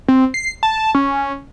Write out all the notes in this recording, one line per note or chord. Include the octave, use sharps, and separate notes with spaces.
C4
C7
A5
C#4